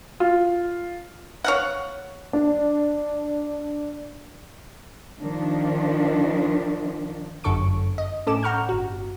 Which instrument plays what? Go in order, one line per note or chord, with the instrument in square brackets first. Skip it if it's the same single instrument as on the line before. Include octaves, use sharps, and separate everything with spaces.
[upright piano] F4
[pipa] C#5 F5 F#5
[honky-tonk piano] D4
[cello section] D#3 F3 D4
[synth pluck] G1 F#2 D3 A4 C#6 D7
D#5
A2 C#4 A4 G#5 D6 E7
F#5 A#5 C#6 F6 G6
G1 F#4